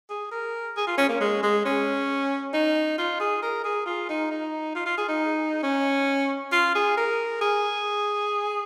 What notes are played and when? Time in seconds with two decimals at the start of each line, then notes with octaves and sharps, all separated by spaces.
0.10 G#4
0.31 A#4
0.77 G#4
0.87 F4
0.98 C#4
1.09 A#3
1.20 G#3
1.43 G#3
1.65 C#4
2.53 D#4
2.98 F4
3.20 G#4
3.42 A#4
3.64 G#4
3.86 F4
4.09 D#4
4.31 D#4
4.76 F4
4.86 F4
4.98 G#4
5.08 D#4
5.63 C#4
6.52 F4
6.75 G#4
6.97 A#4
7.41 G#4